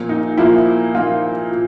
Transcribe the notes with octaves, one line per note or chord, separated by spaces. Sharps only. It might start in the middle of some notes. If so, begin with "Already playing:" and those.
Already playing: A#2 F3 A#3
D#4
A#2 F3 A#3 E4
A#2 F3 A#3 D#4 F4
A#2